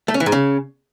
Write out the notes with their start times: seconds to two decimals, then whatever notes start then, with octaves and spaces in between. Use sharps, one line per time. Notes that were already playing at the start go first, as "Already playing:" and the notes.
0.08 A3
0.14 C#4
0.20 E3
0.26 G#2
0.32 C#3